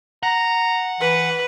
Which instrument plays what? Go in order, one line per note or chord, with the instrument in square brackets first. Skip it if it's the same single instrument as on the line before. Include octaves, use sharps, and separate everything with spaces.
[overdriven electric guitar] F#5 [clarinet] A#5
[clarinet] E3 [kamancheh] B4